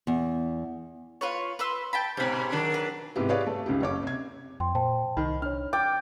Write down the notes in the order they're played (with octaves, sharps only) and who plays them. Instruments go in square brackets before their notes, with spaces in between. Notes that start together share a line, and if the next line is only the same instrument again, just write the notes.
[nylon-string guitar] E2
[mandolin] F4 B4 C#5
B4 C6 E6
G5 A5 B5
[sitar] G#2 B2 [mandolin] G4 B5
[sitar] D#3 F#3 D4
[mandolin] B4
[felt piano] G#2 C3 B3 E4 G4
G4 G#4 B4 C#5 D5 F5
A3
C#2 C#3 D#4 G4
F#1 C#5 D6
C3 G#6
[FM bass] F2 [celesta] G5 C6
[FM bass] A#2 [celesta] C5 G5 A5
[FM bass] C2 [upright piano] D#3 [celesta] B5
[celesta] D4 C#5 [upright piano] F6
[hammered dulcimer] G5 [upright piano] D6 [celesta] A6